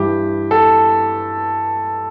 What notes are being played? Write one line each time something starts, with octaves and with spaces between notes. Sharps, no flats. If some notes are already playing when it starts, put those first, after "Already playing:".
Already playing: G2 E3 G4
A4